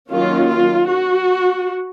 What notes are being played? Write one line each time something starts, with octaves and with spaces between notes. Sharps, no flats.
D#3 F#3 A#3 C#4 F4
F4
F#4